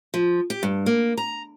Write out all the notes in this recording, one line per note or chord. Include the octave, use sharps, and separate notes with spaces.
F3
G4
G2
A#3
A#5